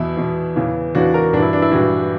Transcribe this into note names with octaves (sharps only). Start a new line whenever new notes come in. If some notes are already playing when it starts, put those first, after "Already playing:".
Already playing: E2 B2 E4
E2 B2
E2 C#3 E3
E2 C#3 E3 D4 F#4
F#4 A#4
G2 E3 D4 E4 F#4
D4
E4
G2 E3 D4 F#4